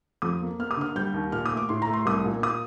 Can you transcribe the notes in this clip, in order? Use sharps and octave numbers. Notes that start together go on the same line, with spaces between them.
F2 D#6
A#3
A#3 F6
D#6
D3 F6
G3 G6
D#2
A#2 F6
D#6
A3
D6
A2 C6
A#5
A3
C6
C2 D#6
A#2
A#2 D#6